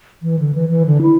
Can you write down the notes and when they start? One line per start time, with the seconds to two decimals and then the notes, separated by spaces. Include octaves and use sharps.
0.22 E3
0.39 D3
0.54 E3
0.69 E3
0.86 D3
1.01 E4